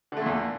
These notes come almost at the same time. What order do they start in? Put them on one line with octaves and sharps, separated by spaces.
D3 A3 A#2 E2